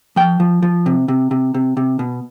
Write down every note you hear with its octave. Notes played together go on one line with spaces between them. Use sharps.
F3 G5
F3
F3
C3
C3
C3
C3
C3
B2